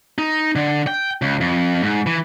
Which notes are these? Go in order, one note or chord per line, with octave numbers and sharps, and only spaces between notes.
D#4
D3
G5
C#2
F2
G#2
E3